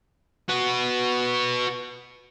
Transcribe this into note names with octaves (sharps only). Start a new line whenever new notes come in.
F#4 B4